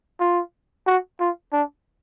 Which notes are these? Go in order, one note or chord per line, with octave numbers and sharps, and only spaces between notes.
F4
F#4
F4
D4